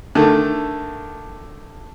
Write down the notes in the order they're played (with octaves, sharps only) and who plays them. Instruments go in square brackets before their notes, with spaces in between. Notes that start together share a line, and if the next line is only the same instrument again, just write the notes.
[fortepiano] D3 D#3 A3